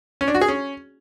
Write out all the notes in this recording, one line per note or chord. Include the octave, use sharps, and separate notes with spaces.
C#4
D4
F#4
G#4
C#4